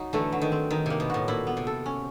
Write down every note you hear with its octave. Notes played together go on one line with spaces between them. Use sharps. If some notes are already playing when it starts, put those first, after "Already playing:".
Already playing: F#3 D#4
D3 E3 A3
F#3
D#3
C4
D#3 D#4
C3 A#3
B2
A2 F#4
A#2 E4
B3
C3
A4
C#4